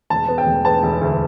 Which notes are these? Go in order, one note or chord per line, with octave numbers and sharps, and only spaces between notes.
E1 A5
B3
G5
E1
B3 A5
E1
D2